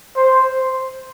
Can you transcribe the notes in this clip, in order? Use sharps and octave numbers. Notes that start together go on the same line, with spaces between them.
C5